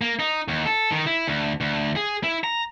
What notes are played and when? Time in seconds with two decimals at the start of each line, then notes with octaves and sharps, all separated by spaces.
0.01 A#3
0.20 D#4
0.48 D#2
0.66 A4
0.91 D#3
1.06 E4
1.28 D2
1.61 D2
1.96 G#4
2.23 E4
2.44 A#5